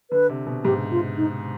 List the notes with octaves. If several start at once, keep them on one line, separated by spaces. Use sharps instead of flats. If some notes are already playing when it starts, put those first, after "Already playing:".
D3 B4
C3
B2
G#2 G4
F4
D#4